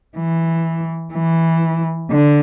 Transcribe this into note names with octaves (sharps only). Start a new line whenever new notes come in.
E3
E3
D3